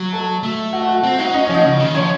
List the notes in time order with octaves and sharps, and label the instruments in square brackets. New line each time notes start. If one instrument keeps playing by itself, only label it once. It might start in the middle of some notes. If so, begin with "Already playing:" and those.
Already playing: [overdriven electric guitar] F#3
[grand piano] A4 A5
[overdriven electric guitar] A3
[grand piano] F#4 F#5
F#4 F#5
[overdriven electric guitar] C4
[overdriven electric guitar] D#4 [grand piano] F#4 F#5
[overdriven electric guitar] C#4 [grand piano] D#5
[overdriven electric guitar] F3 [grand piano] C#5
[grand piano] D#4 D#5
[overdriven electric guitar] C#3
D#3
[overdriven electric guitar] F3 [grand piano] C#4 C#5